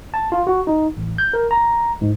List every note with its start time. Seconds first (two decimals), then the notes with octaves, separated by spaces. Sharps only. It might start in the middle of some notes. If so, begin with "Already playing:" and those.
0.14 A5
0.32 F4
0.47 F#4
0.67 D#4
0.97 A1
1.18 G6
1.33 A#4
1.51 A#5
2.01 G#2